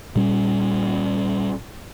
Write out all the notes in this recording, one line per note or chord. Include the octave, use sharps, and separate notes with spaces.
A#2 G3 C#4